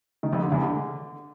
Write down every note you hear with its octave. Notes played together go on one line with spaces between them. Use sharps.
D#3
F2
D3
E2
D3